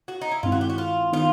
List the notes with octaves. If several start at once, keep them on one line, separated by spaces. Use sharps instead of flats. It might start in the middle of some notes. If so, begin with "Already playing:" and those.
F#4
D#4
E4
G2 D#3 G#3 C4 E4 F4
F#4
G4
F#4
F4
D#3 G3 B3 D#4 F4